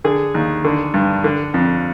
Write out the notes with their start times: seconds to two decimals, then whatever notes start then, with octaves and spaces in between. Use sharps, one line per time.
0.04 D3 G#4
0.34 D#2
0.64 D3
0.94 G2
1.24 D3
1.54 F2